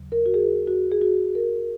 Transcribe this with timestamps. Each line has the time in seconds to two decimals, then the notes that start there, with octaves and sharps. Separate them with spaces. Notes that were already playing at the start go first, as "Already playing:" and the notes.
Already playing: D#2 C#3 F#3
0.12 A#4
0.26 F#4
0.34 G#4
0.68 F#4
0.92 G#4
1.01 F#4
1.35 A#4